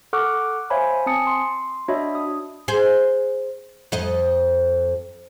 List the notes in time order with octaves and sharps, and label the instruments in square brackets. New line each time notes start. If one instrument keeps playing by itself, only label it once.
[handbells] A4 F#5 C#6 D6 F6 F#6
C5 C#5 E5 F5 G#5 B5
C4 G#5 A5 D#6 C#7
C6
D4 F#4 C#5 D#5 E5 B5
D4 D#6
[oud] G#4 C5
F2 D#5